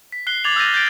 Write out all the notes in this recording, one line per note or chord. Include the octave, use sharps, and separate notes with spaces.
B6
F#6 C7 G7
D6 G#6 A6 F7 F#7
E6 F6 G6 A6 A#6 D#7
G6 A6 A#6 D7